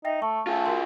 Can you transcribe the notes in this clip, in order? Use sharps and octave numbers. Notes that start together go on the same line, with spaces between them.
D#4 E5 G5 A#6
A3 C#6
A3 F4 G#4
F#4 A#4 C6